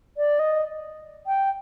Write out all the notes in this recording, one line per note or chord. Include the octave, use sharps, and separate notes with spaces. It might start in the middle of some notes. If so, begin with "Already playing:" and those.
D5
D#5
G5